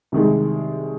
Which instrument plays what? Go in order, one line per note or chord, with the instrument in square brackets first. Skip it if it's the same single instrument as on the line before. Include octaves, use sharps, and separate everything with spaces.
[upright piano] C2 C3 D#3 G#3